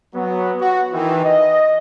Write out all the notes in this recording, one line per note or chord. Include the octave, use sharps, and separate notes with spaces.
F#3 B3
F#4
D#3 E3
D#5